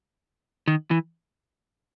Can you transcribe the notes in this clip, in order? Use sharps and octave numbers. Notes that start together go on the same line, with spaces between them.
D#3
E3